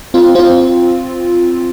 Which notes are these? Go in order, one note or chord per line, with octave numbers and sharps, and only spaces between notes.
C4 F4
C4 F4